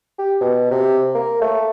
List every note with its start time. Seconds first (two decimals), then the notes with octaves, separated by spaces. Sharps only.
0.18 G4
0.41 B2
0.71 C3
1.15 A#3
1.41 A3